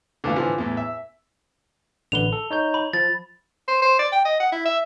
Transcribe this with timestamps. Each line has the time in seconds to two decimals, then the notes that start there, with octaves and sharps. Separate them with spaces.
0.24 D3 E3 A3 F4
0.36 D3 E3 F3
0.58 E2 A2
0.77 E5
2.12 A1 D3 B4 F7 G7
2.33 A4
2.51 D#4 C#5 G6
2.74 B5
2.93 F3 A6
3.68 C5
3.82 C5
3.99 D5
4.12 G5
4.25 D#5
4.40 F#5
4.52 E4
4.65 E5